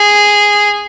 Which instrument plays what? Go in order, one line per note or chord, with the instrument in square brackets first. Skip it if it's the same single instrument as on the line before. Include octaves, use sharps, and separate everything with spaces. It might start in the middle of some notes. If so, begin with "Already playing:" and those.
Already playing: [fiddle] G#4